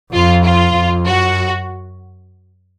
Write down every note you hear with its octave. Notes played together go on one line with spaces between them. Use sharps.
F2 F4
F4
F2
F#2 F#4